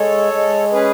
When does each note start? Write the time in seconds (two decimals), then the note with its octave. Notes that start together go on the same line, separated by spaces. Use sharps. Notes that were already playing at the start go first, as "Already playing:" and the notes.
Already playing: G#3 A4 C#5
0.33 G#3
0.72 C#4 G#4 B4